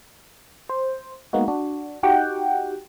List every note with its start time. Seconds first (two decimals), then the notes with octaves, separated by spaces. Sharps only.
0.69 C5
1.33 G#3 A#3 B3 D#4 F#4
1.48 D4 F#4
2.03 D#4 F#4 G4 F#5 G5